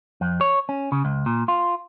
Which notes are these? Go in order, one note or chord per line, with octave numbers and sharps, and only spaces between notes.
F2
C#5
C#4
C#3
C#2
A#2
F4